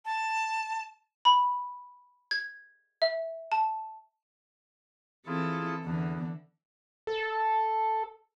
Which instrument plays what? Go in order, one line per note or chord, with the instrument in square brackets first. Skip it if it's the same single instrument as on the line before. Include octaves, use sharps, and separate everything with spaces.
[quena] A5
[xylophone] B5
G#6
E5
A5
[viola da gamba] E3 C4 A4 [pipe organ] E4 F4 G#4
[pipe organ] E2 [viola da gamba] D3 E3
[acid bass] A4